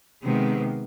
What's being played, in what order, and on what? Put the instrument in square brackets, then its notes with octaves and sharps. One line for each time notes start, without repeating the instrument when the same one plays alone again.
[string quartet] C3 D#3 G#3 B3